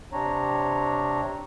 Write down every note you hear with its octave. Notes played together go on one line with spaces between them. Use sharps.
C3 C4 D4 C#5 A#5